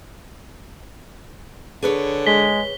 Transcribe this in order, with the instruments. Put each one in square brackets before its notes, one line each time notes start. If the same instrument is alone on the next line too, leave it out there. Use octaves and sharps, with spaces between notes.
[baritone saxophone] D3 [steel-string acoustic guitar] G#4 B4 C#5
[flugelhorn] G#3 [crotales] B6 G7